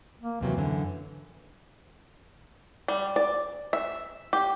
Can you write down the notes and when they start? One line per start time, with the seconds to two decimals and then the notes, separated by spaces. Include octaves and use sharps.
0.21 A#3
0.41 D#2 C3 E3 F#3
0.57 F#2 D3
2.88 G3
3.16 D5
3.73 E5
4.33 G4